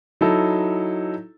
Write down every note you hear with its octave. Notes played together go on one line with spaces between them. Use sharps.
F#3 D#4 E4 A4